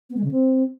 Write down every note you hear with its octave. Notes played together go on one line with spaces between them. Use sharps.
B3
G#3
C#3
C4